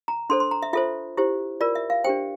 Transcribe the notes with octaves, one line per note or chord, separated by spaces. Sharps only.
A#5
D4 A4 C5 C6
C6
A#5
E5
F4 A4 C5 E5
E4 G4 C5
F4 A#4 D5
E5
F5
D4 G4 C5 G5